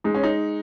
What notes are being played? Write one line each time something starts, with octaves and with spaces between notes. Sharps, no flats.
G#3 D#4
C#4
D#4